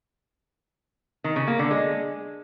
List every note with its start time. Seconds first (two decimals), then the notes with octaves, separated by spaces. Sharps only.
1.24 D#3
1.36 C#3
1.48 A#3
1.59 D3
1.71 G#3